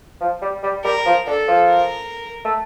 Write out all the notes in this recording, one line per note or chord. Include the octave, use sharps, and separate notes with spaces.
F3
G3
G3
G3 A#4
F3
D3 A4
F3
A#4
A3